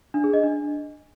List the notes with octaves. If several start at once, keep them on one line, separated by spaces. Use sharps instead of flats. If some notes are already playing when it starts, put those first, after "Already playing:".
D4
G#4
D#5
D4